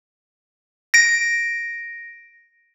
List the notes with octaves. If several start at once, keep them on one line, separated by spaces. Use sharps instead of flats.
A#6 D7